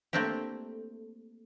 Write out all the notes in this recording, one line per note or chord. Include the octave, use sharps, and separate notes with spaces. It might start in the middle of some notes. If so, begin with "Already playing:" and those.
A3 A#3 C4 D4 G4